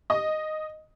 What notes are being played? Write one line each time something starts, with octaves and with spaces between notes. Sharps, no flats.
D#5